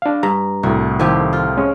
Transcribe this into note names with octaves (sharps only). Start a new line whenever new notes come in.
D4 F5
G2 A#5
C2 A2 F#4
D#3 F3 E4 G4
F4
G#3 C#4